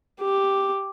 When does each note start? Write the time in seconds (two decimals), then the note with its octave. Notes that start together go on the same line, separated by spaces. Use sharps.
0.20 G4